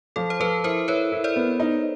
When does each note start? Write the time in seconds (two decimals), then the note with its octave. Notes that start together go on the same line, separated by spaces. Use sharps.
0.16 F3 A4
0.30 C5
0.40 F3 A4 B4
0.64 E4 A#4 C5
0.88 E4 B4 C#5
1.12 E4
1.24 C5 D5
1.36 B3
1.60 D#4